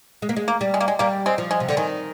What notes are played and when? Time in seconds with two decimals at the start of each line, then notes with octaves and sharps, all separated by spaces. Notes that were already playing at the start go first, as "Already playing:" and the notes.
0.22 G#3
0.29 A#3
0.36 G#3
0.48 A#3
0.61 G3
0.74 G#3
0.81 A#3
0.88 G#3
0.99 G3 A#3
1.26 G#3 C4
1.38 F3
1.51 G#3
1.60 C3
1.69 D3
1.77 D#3 G#3